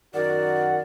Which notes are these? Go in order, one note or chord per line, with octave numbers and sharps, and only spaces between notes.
F#2 D#3 F#4 A#4 D5 F#5